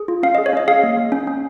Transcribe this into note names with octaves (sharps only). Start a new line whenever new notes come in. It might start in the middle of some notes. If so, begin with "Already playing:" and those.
Already playing: G#4
F4
C#4 F5
D#5
G#4
C#5
C#4 D#5
G#4 F5
A#3
A#3
C#4
C#4